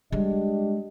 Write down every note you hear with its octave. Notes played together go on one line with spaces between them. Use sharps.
G3 G#3 D4 G4 D#5